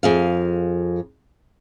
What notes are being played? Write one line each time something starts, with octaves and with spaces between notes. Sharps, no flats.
F2 G#4 F5